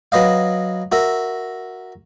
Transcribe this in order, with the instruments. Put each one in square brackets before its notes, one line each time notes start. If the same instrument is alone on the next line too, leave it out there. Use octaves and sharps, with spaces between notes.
[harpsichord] F#3 B4 D#5 F5
F#4 A#4 E5